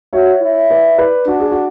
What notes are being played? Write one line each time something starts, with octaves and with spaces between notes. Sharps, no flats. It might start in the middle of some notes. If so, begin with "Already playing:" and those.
F#4 C#5 E5
E4
B4 D5
B4 D5
D4 F#4
G#4
F#4